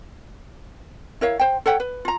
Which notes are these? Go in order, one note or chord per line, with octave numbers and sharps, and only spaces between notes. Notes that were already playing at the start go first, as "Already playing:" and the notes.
E4 A#4 C#5 F5
C5 G5
A4 C#5 F#5 G5
B4
F4 A#5